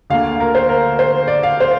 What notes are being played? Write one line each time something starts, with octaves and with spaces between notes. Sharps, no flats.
D2 D3 A#3 F5
A#4
C5
A#4
C5
D5
F5
C5